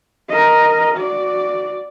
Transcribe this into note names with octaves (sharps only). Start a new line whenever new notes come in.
A#4 D#5
F#4 D5